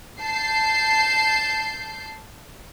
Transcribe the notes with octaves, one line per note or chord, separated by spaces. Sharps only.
A5 G6 C7